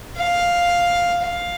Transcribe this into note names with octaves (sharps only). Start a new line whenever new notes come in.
F5
F5